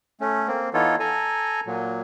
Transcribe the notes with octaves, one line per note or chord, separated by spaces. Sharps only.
A3 C#4
A#3 C4
E3 B3 D#4 F4 A4 C#5
A4 G#5 A#5
A#2 F#3